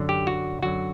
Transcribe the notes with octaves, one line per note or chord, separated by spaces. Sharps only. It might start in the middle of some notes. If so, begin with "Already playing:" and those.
Already playing: F#2 D3 F#3
G4
F#4
F#2 D3 F#3 F#4